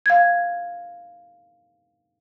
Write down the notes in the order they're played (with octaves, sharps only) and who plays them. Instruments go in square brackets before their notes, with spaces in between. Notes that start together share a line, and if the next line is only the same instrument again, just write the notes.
[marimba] F5 G#6